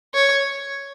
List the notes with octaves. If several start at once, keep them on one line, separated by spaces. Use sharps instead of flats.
C#5